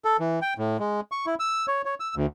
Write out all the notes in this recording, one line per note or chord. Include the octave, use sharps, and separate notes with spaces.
A4
E3
G5
A2
G#3
C#6
E4
E6
C#5
C#5
E6
D2